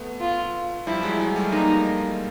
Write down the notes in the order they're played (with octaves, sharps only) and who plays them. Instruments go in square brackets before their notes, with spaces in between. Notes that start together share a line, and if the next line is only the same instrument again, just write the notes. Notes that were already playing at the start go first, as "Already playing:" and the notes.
Already playing: [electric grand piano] A3 B3
[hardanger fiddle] F4
[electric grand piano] F3 G3 [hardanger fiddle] E4
[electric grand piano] F#3 G#3
F#3 G#3
G3 A3
[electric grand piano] G#3 A#3 [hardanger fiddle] D#4